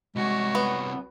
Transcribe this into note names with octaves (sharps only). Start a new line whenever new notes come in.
C2 G#3 F#4 C#5
B3